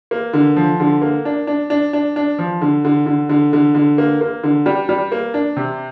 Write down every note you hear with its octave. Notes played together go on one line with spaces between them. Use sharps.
A#3
D3
F3
D3
A#3
D4
D4
D4
D4
D4
F3
D3
D3
D3
D3
D3
D3
A#3
A#3
D3
G3
G3
A#3
D4
C3